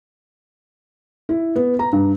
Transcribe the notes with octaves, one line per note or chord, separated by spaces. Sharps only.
E4
B3
A#5
G2